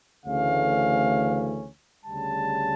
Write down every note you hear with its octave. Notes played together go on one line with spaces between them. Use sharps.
D2 C#3 E3 A3 C#4 F5
D2 C#3 G3 A5